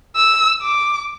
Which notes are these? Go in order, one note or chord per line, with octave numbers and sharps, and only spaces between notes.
E6
D6